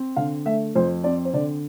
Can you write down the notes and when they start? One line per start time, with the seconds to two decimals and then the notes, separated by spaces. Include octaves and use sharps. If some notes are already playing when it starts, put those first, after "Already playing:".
Already playing: C4
0.16 D3 F5
0.45 A3 E5
0.75 F2 C5
1.04 C4 D5
1.25 C5
1.33 D3 D5